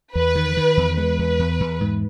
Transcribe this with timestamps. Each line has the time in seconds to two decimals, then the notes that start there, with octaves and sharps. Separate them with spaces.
0.15 E2 B4
0.35 D#3
0.57 D#3
0.77 E2
0.97 G#3 B4
1.19 E2
1.39 E2
1.60 E2
1.81 G#2